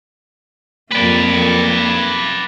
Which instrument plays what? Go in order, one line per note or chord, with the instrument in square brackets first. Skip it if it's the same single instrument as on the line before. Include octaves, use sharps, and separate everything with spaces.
[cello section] F2 A#3 [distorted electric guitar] B4 D5